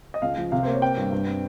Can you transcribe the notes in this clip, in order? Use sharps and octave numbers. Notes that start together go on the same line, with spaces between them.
D#5
C#2 F5
F3
C3 F5
A#3 C5
C#5
C4 G5
G2
G2
C4